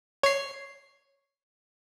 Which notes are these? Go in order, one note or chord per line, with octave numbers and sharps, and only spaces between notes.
C#5 C7